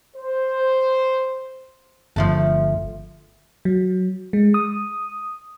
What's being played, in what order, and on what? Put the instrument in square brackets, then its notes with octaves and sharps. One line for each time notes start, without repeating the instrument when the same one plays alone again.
[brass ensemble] C5
[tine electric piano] G1 [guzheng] F3 A3 A5
[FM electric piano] F#3
G#3
D#6